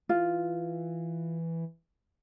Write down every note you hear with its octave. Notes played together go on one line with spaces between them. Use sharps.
E3 F4